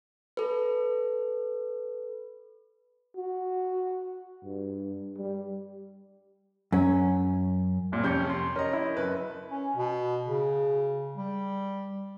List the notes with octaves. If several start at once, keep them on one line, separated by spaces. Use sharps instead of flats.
A4 B4
F#4
G2
G3
F#2 C#4
C2 A#2
F2 C3 C#4 G6 C#7
C6
C#4 A#4 D#5
E4
F#1 B4
C#4
B2
C#3
G3